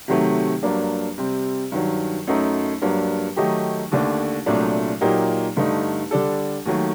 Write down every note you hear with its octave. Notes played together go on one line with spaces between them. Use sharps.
C3 D#3 F#3 A3
G2 F#3 A#3 D4
C3 G3 C4
G2 D#3 F#3
F#2 F#3 A3 D#4
G2 F#3 A#3 D4
D#3 F#3 A3 D#4 G4
D#2 D3 A3 D4
C2 A#2 F#3 A3 D4
A#2 F#3 A#3 D#4 G4
G2 D3 A3 D#4
D3 G3 D4 A4
D#2 D#3 F#3 A3